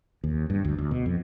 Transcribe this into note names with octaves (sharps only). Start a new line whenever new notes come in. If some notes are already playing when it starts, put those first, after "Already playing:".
D#2
G2
D2
D2
B2
F2